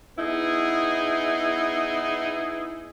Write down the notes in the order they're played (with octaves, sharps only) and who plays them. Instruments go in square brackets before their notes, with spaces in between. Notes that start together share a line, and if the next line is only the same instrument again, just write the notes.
[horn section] B3 D#4 E4 G#4